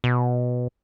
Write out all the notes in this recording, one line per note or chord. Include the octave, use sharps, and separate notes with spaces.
B2